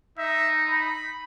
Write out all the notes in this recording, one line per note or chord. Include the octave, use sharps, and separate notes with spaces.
D#4 E5
B5